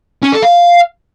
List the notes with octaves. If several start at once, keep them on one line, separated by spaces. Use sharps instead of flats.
C#4
A4
F5